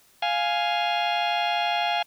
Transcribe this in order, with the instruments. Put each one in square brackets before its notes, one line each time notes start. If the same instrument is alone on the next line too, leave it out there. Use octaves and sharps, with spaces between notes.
[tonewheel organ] F5 G#5